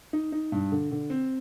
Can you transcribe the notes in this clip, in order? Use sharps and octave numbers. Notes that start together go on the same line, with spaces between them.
D#4
D#4
G2
D3
D3
C4